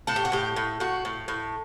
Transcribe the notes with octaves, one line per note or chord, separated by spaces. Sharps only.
A2 A4
G4
F#4
A2 G4
A2
A2 F#4
A2
A2